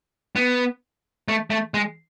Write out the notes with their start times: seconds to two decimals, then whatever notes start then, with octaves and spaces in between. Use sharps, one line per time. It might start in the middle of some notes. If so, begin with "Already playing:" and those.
0.36 B3
1.28 A3
1.50 A3
1.74 G#3